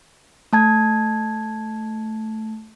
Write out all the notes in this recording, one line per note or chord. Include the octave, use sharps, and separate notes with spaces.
A3 A5 G#6